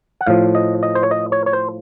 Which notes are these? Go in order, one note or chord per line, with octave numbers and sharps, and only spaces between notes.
F#5
A2 F3 F5
D#5
D#5
C5
C#5
D#5
C#5
C#5
C5